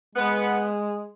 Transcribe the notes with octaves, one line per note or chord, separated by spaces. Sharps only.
G#3 B3